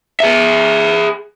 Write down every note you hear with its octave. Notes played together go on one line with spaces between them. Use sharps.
G#4 E5